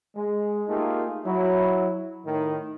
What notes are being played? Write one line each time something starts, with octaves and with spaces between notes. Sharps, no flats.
G#3
A3 A#3 D#4 F4 G4 G#4
F#3 E4
A2 D#3